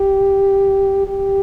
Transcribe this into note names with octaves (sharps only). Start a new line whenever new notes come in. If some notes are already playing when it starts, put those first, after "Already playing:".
Already playing: G4
G4